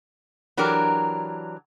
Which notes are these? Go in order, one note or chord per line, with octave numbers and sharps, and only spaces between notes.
E3 F#3 D4 G4 A#4